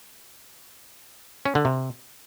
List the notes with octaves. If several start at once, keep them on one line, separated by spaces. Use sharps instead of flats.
C#4
D3
C3